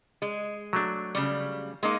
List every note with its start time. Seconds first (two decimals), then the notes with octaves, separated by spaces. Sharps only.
0.22 G#3
0.73 F#3 A3 D4
1.15 C#3 G3
1.83 G#3 A#3 D#4